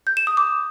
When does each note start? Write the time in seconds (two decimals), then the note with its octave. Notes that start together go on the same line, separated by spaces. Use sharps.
0.07 G6
0.17 E7
0.27 D#6
0.37 D6